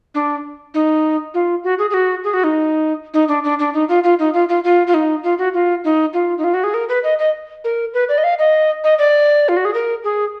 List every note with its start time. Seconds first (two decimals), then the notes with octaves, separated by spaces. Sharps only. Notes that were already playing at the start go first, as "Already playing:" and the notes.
0.15 D4
0.74 D#4
1.34 F4
1.64 F#4
1.79 G#4
1.90 G#4
1.94 F#4
2.24 G#4
2.34 F#4
2.44 D#4
3.14 D#4
3.28 D4
3.44 D4
3.59 D4
3.74 D#4
3.89 F4
4.04 F4
4.19 D#4
4.34 F4
4.49 F4
4.64 F4
4.87 F4
4.94 D#4
5.24 F4
5.38 F#4
5.54 F4
5.84 D#4
6.14 F4
6.38 D#4
6.44 F4
6.54 F#4
6.64 G#4
6.74 A#4
6.89 B4
7.04 D#5
7.19 D#5
7.64 A#4
7.94 B4
8.09 D5
8.18 D#5
8.24 F5
8.39 D#5
8.84 D#5
8.99 D5
9.49 F4
9.57 F#4
9.65 G#4
9.74 A#4
10.04 G#4